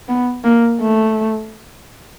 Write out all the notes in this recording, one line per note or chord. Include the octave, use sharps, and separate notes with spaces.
B3
A#3
A3